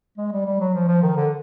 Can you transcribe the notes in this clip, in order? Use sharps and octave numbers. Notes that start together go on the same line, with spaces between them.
G#3
G3
G3
F#3
F3
F3
D#3
D3